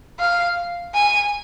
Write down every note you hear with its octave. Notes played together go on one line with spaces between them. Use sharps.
F5
G#5